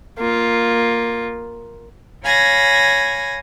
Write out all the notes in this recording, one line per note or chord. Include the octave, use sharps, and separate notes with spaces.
A#3 F4
C#5 F5 G#5 B5 G#6 A#6